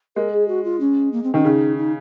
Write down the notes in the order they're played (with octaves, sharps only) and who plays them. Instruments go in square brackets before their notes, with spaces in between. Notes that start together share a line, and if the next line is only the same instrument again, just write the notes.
[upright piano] G#3 [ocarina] A#4
[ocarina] G#4
F#4
F4
C#4
A#3
C4
[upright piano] D#3 [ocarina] C#4
[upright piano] C#3 [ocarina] D#4
[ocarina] D#4